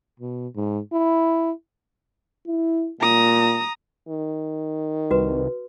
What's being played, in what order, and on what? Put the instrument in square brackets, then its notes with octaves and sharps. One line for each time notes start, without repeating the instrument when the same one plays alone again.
[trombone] B2
G#2
E4
[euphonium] E4
[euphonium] A#2 [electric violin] A#5 D#6
[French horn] D#3
[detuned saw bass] C2 [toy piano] F#4 B4